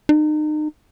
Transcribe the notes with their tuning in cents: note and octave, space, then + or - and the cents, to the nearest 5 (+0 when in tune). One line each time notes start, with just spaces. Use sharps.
D#4 -35